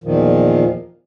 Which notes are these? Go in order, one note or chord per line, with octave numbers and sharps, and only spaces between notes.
E2 A#2 D#3 F3